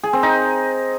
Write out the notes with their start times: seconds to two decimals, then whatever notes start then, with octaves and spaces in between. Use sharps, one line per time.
0.03 G#4
0.13 C4
0.23 D#4